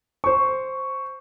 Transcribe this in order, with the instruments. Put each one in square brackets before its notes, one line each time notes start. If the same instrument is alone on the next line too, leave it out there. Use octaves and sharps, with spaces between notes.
[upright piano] C5 C#6